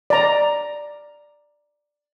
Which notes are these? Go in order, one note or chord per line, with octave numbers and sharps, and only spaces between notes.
D5 A#5